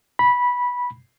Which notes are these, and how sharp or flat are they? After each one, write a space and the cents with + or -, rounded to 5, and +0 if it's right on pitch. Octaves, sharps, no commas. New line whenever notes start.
B5 -10